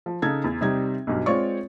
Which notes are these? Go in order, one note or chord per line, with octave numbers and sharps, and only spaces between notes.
F3
C#3 D#4 A4 G#6
E2
C3 G3 D#4 G#6
B1 G2 F#3
G#3 C4 F4 C#5 D5 C#6